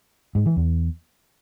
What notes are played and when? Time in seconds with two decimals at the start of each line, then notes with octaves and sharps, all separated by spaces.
0.35 G#2
0.46 E3
0.57 E2